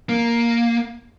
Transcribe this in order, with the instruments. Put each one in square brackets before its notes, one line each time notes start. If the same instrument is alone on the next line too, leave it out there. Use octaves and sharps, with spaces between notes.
[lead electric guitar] A#3